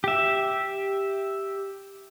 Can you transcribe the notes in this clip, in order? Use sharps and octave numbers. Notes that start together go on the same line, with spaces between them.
G4 E5